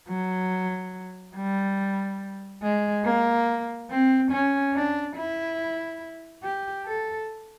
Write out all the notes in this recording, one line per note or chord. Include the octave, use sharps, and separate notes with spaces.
F#3
G3
G#3
A#3
C4
C#4
D4
E4
G4
A4